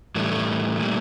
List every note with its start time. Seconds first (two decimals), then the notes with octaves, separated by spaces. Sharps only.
0.15 A2 E3 G3 A3
0.31 A3
0.78 A#2 G3